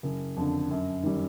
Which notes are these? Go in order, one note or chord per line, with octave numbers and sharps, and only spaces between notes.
F#1
F2 D3
F#2
D#3 G3